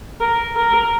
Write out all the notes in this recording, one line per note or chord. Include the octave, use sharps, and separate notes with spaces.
A#4
A#4